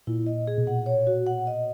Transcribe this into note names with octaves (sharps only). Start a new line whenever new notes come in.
A#2 E4
D#5
G#4
B2
A#2 F#5
C#5
F#4
F#5
D#5